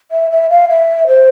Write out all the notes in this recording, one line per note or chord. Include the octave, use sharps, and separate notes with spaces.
E5
E5
F5
E5
C5